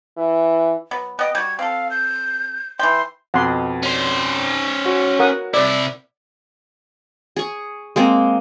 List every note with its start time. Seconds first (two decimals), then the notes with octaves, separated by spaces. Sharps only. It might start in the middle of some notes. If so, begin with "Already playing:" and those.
0.17 E3
0.91 F#3 B3
1.19 B3 D#5 G5
1.35 G3 F#4 G#6
1.59 C4 A4 F5
1.91 G6
2.79 E3 G5 C6
3.34 F2 B2 F#5 C6
3.83 C#4 C5
4.86 F#4 C#5
5.19 A#4 F#5 D#6
5.54 C3 E4 D5
7.36 G#4 C#6
7.96 G#3 A#3 C4